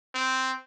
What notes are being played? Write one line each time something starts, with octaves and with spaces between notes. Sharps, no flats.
C4